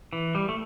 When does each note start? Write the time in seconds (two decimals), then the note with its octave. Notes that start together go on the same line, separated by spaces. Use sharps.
0.13 E3
0.35 G3
0.49 A3